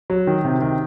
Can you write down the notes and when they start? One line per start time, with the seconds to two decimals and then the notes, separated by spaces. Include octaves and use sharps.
0.10 F#3
0.27 D#3
0.45 C3
0.61 D#3